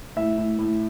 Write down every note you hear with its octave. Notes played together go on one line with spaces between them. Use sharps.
A2 E5
A2
A2